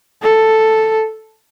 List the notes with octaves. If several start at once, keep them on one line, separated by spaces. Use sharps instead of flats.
A4